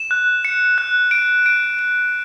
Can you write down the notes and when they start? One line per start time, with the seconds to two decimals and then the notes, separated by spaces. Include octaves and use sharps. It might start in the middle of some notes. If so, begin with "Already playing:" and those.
Already playing: E7
0.11 F#6
0.45 C#7
0.78 F#6
1.11 D7
1.46 D7
1.79 D7